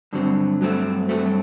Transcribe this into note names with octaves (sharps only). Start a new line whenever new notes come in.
G2 D3 F#3 C4
G2 F#3 A3 C4
G2 F#3 A3 C4